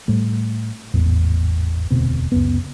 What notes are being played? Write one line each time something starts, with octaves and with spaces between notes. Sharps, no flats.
A2 G3 A3
G#1 E2 A2
E1 D2 B2 C4
C#2 F#2 B3